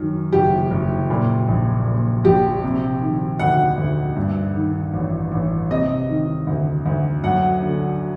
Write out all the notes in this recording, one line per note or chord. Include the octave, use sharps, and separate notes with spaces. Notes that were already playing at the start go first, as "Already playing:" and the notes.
Already playing: F#2 D#3
F#1 G4
F#1
A#2
A#1
A#2
A#1 G4
C3
D#3
D2 F#5
D2
G2
D#3
A1
A1
C3 D#5
D#3
D2
D2
F#2 F#5
D3